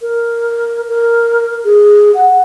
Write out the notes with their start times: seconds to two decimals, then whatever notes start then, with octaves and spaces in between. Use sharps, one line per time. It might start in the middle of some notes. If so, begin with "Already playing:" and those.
0.01 A#4
0.89 A#4
1.65 G#4
2.14 F#5